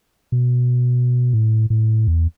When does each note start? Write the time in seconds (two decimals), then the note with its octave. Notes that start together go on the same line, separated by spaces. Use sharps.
0.32 B2
1.33 A2
1.70 A2
2.08 E2